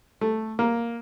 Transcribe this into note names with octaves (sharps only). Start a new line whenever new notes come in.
A3
A#3